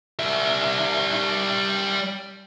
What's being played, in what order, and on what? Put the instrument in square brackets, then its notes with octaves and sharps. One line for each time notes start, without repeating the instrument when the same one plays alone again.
[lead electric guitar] G3 E5